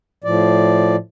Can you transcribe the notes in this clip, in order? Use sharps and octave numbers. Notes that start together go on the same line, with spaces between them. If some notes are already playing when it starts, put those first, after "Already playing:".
A2 F3 D5